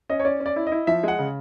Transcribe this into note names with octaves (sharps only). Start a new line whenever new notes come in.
C#4 D#5
C#5
C#4 D5
C#4
D5
E4
D#5
E4
F3 E5
G#3 F#5
C#3